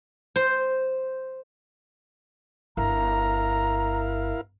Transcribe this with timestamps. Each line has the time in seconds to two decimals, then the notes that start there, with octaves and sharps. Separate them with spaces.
0.36 C5
2.77 G1 E4 A#4 F5 A#5